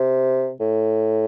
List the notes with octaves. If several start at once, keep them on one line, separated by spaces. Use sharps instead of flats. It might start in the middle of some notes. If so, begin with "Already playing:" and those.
Already playing: C3
A2